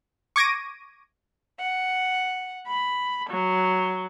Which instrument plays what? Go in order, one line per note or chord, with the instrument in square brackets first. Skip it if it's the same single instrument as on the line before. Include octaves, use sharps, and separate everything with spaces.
[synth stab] C#6 D6 G#6 A#6 D7 D#7
[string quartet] F#5
B5
F#3